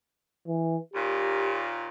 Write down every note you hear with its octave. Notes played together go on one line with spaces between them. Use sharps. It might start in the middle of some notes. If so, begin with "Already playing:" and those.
E3
D#2 A#2 G4